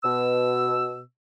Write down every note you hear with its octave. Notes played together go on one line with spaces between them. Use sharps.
B2 E6